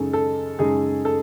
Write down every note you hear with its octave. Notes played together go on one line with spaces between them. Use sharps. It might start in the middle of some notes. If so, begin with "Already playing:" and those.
Already playing: F#2 C#3 G#3 D#4 A4
A4
F#2 C#3 G#3 D#4 G#4
A4